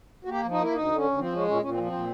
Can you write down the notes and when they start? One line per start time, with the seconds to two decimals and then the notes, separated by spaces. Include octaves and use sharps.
0.25 F#4
0.28 A#3 G4
0.44 F3
0.51 D#4
0.58 A#3 E4
0.73 D2 D#4
0.88 D3
0.96 C#4
1.03 D2
1.18 F3 C4
1.33 G#3 C#4
1.47 A#2 C#4
1.62 A#2 C#4
1.71 C4
1.77 F3
1.86 C4
1.92 A#2